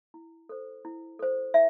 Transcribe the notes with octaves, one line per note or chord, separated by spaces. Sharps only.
E4
A4 C5
E4
A4 C5
E4 E5